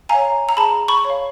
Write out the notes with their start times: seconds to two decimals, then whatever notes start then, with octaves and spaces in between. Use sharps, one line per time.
0.09 C#5 F5 G#5 A#5
0.49 A#5
0.57 G#4 A5 B5
0.88 B5 C#6
1.05 C#5
1.10 F5